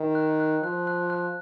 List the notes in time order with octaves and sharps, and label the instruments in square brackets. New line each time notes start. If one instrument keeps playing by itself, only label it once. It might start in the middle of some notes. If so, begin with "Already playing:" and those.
Already playing: [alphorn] D#3
[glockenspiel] F#6
F#6
[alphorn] F3 [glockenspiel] F#6
[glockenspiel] F#6
F#6